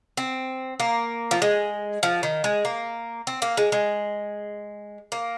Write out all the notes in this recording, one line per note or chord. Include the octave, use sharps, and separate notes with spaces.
C4
A#3
F3
G#3
F3
D#3
G#3
A#3
C4
A#3
G#3
G#3
A#3